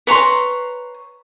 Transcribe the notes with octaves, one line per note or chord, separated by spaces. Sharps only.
B4 C#5 A#5 C6